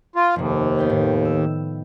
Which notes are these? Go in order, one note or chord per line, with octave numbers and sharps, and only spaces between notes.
F4
F1 D#2 C3
B3 G5
A2 D#3
E6